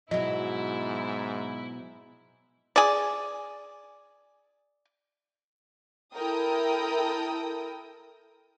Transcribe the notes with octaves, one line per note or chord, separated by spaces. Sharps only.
G#2 B2 F#3 E4 D#5
G#4 D5
E4 A4 A#4 G5 D#6